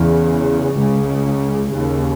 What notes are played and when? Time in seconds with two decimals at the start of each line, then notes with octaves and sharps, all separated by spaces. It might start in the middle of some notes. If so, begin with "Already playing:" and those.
Already playing: E2 C#3
0.75 C#2 C#3
1.69 D#2 C#3